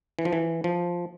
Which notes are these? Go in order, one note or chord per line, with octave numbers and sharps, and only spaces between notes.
E3
F3
E3
F3